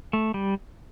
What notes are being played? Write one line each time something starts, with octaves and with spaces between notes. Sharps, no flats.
A3
G3